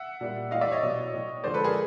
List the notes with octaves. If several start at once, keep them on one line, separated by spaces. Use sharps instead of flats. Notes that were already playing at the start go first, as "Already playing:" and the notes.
Already playing: E5 F#5
A#2 G3
A2 E3 G3 D#5 F5
D5 E5
C#5 D#5
B2 F#3
A2 F#3
D3 F3 G#3 C5 D5
A4 B4
G#4 A#4